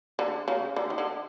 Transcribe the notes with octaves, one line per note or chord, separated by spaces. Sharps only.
D3
C#3
D3
D#3
D3